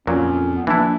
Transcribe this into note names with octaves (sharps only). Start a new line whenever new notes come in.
F2 A#2 F#3 C#4
B3
E3 F3 A#3 D4 E4